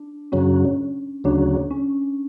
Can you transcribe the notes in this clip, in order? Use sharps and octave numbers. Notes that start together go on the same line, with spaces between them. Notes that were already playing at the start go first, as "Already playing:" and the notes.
Already playing: D4
F#2 C#3 F#3 C#4
D2 C#3 F#3 D4
C#4